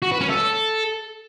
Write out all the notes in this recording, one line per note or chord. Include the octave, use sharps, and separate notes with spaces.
F#4
B4
C#4
A4